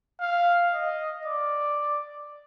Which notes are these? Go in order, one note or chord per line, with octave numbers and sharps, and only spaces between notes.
F5
D#5
D5